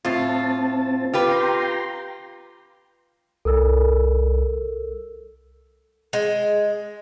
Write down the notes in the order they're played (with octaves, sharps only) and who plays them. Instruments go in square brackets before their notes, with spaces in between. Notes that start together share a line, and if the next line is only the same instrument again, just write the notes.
[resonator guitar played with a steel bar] A2 F4 [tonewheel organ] C4 A5
[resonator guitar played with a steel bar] F4 G4 B4
[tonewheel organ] G5 A#5 C6
[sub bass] C2 [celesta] A4 A#4 E6
[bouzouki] G#3